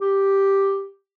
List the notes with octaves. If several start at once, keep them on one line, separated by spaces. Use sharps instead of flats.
G4